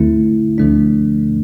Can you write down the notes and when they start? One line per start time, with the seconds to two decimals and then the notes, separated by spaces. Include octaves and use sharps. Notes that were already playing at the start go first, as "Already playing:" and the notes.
Already playing: D2 D3 A3 C4 E4
0.58 D2 D3 F3 A3 D4